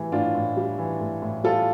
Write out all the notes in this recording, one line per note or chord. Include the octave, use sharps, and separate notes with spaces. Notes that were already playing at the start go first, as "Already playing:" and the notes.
Already playing: A2 E3 G3
A2 D4 F4
A2
G3
E3
A2
A2
G3 F4 A4